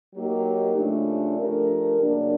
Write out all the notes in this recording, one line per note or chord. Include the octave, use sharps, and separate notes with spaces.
F#3 A#3 D#4 G4 A#4
C#3 F3 A3 D4
F3 A3 D4 G4 A#4
C#3 F#3 A#3 D4